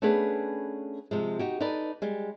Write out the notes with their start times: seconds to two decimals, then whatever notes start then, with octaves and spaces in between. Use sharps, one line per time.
0.02 A3 B3 C#4 D4 G#4 B4
1.11 C3 F3 G#3
1.39 D#4 F#4 G4
1.60 D#4 A4 B4 D5
2.02 G3 G#3